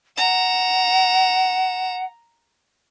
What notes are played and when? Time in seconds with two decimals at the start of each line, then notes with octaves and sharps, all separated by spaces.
0.17 F#5 A#5 E7